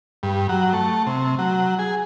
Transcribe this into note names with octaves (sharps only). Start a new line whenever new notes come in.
G2
F#3
A3
C3
F#3
G#4